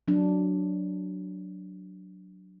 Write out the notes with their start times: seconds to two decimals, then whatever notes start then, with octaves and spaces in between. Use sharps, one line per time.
0.08 F#3 D4